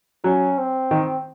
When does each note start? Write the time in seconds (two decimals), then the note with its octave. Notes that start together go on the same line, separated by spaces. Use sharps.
0.24 F#3 C#4
0.58 C4
0.91 D#3